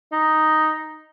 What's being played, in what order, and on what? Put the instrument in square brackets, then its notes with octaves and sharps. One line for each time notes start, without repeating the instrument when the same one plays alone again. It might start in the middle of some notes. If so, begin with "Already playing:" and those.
[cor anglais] D#4